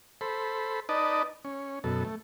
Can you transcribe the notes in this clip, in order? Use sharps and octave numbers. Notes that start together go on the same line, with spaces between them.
A4 C5 B5
D#4 B4 D5 D#5 A5
C#4
F#2 B2 A4
A3